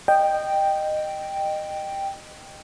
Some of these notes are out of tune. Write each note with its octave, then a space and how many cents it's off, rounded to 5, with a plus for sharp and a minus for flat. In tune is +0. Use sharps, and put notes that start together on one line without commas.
D#5 -20 G5 +0